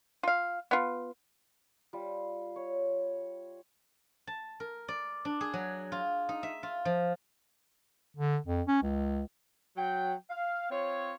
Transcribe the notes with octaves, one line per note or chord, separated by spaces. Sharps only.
F4 F5
B3 F4
G3 F4
C#5
A5
A#4
D5
D4
G#4
F#3
F4
D#4
E5
F4
F3
D3
F2
C#4
C#2
F#3 G5
F5
C4 F4 C#5